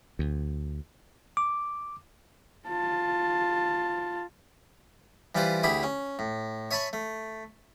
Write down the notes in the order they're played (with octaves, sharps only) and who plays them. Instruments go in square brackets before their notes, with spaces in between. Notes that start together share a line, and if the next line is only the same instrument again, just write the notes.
[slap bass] D2
[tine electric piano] D6
[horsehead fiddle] F4 A5
[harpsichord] E3 G3 E4 F4 B4 C5
D2 E4 G4 G#4 E5 B5
C#4
A2
C#5 E5 G#5 A5 B5 C#6
A3